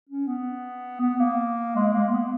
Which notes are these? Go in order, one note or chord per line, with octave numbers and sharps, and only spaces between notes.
C#4
B3
B3
A#3
G#3
A#3
B3